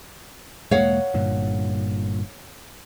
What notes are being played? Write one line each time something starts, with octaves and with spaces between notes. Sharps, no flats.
E1 G#3 A#3 C#5 F5 F#5
G1 G2 A#2